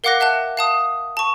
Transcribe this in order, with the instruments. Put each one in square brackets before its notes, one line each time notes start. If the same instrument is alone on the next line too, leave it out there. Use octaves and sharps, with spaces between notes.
[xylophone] A#4 F5 F#5 D6 F#6 A#6
E5 F#5 A5 F#6
F5 A5 D#6
A5 C#6